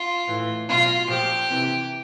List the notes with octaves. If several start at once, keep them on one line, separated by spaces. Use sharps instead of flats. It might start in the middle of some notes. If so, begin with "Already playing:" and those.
Already playing: F4
A2 E3
B2 F#3 F4
A#2 F3 G4
C3 E3